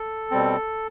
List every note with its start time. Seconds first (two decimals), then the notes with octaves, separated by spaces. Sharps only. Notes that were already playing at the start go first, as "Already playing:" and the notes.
Already playing: A4
0.31 B2 G3 C4